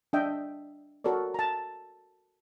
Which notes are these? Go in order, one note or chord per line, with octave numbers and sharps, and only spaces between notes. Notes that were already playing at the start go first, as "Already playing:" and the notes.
D4 D#5 E5 G5
F#4 A4 A#4 C#5 D5
A5 A#5